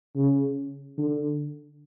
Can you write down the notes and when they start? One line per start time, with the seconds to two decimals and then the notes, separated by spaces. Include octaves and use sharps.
0.16 C#3
0.98 D3